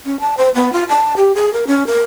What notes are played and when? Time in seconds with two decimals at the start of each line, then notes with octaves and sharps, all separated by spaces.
0.06 C#4
0.20 A5
0.37 C5
0.55 B3
0.73 F4
0.89 A5
1.17 G4
1.35 G#4
1.53 A#4
1.67 C#4
1.87 A#4